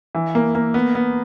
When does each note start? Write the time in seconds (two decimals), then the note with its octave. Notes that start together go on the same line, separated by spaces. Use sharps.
0.15 E3
0.35 A#3
0.55 A#3
0.74 B3
0.95 B3